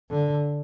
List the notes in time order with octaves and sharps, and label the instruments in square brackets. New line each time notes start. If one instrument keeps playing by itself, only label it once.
[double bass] D3